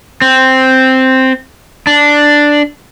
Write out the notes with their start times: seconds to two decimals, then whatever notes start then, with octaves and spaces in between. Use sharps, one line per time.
0.22 C4
1.87 D4